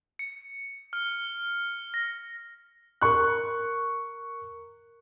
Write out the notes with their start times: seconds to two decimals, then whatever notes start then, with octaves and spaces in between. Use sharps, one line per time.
0.19 C#7
0.93 F6
1.94 A#6
3.01 A#4 C#6 F#6